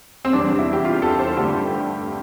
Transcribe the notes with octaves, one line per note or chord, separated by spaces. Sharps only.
C4
E2 C3 G3 D4
E4
G4
F4
A4
C5
G2 D3 A3 G4